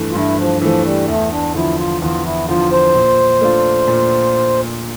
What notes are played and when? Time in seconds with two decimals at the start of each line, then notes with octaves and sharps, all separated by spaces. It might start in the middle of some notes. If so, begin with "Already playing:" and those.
Already playing: G2 E3 A3
0.11 F4
0.15 G2 E4
0.38 F3
0.62 E3 F3 A3
0.85 G3
1.08 E2 A3
1.32 D4
1.54 D3 F3 E4
1.79 F4
2.02 E2 F4
2.25 E4
2.48 D3 F3 F4
2.71 C5
2.95 A#2
3.41 A3 D4 F4
3.88 A#2